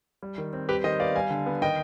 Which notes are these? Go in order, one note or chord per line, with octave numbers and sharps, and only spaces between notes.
G3
D#3
C4
G3 G4 B4
D#3 C5 D#5
B3 D5 F5
G3 F5 G#5
D3
B3
D#3 D#5 G5